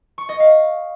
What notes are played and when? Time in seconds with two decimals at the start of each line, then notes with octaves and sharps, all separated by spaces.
0.18 C#6
0.29 D#5
0.40 F5